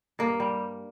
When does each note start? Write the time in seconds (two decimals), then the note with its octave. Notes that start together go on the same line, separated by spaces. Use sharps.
0.19 G2 A#3
0.40 G3